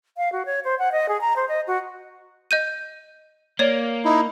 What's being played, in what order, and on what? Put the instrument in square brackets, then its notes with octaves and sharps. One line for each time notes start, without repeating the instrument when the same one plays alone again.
[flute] F5
F#4
C#5
C5
F#5
D#5
G#4
A#5
C5
D#5
F#4
[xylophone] D#5 G6 D#7
[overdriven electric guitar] A#3 [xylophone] C#5 D5
[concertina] D#4 E4